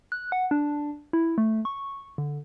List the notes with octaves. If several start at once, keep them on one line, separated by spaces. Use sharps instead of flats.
F#6
F#5
D4
E4
A3
C#6
D3